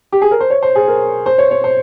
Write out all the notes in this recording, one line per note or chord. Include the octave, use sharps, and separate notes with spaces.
G4
G#4
A#4
C5
C#5
C5
G#4
A#4
C5
C#5
C#5
C5